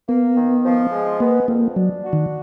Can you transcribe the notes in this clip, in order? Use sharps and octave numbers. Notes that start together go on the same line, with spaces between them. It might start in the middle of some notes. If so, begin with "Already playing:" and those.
A#3 B3
D#3
F3
G#3
A#3 B3
F2 A#3
F#3 D4
F#4
D#3